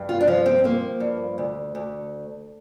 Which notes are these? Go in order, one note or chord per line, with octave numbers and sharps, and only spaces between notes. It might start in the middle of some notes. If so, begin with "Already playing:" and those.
Already playing: G2
F4
D4
F3 F4
C4
F3 A#3
G2
D2
D2